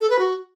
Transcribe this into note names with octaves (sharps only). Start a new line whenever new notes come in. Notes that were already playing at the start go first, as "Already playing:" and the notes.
A4
B4
F#4